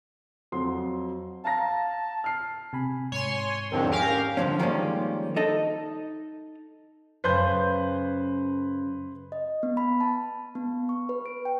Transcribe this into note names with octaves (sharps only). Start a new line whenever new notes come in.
F2 F#3 C6
F5 A5 A#5 A#6
F6 C7
C3 G#5 B5
G#2 C#5 G#5 C6
E2 D3 D#3 F3 C4
C#4 G4 A#4 F5
G2 D3 F3 C#4
D#3 F3 G3 G#3 A#3 C#4
D#4 A4 D#5
F#2 C#3 B4 C5 G6
D#5
B3
B5
A5
B3
C#6
B4
D7
G5